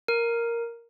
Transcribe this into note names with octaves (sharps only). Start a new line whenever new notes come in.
A#4